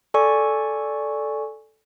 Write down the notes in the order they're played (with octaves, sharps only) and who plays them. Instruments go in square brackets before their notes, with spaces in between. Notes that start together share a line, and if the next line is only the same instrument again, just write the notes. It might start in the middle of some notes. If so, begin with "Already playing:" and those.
[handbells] A4 D5 G#5 C#6